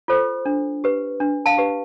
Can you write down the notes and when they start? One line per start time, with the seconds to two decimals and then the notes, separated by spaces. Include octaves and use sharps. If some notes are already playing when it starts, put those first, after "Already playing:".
0.08 F4 A4 C5
0.46 D4
0.84 G4 B4
1.20 D4
1.46 F5 A5
1.58 G4 B4